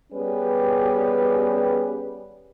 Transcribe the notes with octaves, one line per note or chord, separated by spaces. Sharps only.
G3 B3 C#4 G4 G#4 B4